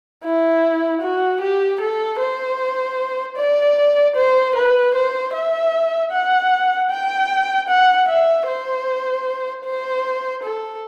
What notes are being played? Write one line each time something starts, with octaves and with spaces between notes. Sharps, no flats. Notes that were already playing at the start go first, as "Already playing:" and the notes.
E4
F#4
G4
A4
C5
D5
C5
B4
C5
E5
F#5
G5
F#5
E5
C5
C5
A4